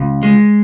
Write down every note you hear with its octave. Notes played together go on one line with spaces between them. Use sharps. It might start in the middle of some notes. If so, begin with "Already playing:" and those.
Already playing: C#2
G#3